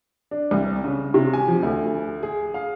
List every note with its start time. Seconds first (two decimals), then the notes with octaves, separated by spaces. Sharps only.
0.31 D4
0.51 C2
0.84 C#3
1.14 C3
1.33 G#5
1.48 F3
1.63 D2
2.23 G#4
2.54 F5